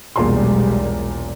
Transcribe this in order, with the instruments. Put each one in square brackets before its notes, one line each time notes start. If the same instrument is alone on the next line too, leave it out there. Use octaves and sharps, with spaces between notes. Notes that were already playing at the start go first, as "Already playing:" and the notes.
[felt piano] E1 A#2 C6 [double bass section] B1 G3 G#3